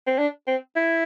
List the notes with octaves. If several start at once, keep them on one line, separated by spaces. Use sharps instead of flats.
C4
D4
C4
E4